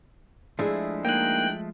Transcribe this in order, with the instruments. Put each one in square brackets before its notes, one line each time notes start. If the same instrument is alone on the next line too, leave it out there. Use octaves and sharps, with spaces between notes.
[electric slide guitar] F3 G#3 A3 [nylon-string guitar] D4 E4 G#4
[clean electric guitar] A#3 D#4 [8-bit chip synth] G5 F#6